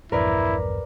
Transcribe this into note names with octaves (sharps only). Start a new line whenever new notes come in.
A#1 E2 G2 E4 A#4 B4 D5